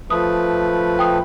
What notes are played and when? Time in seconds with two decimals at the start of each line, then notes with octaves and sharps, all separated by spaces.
0.10 F3 A3 B4 D#6
0.99 G5 D#6